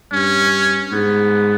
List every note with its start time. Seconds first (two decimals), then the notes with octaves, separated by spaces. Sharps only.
0.12 G2 C#4
0.92 G#2 B3